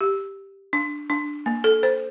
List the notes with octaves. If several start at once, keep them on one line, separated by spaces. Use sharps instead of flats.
G4
D4
D4
A#3
A4
C5